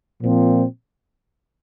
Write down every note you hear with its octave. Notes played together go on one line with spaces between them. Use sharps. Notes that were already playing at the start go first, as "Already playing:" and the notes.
A#2 F3 C4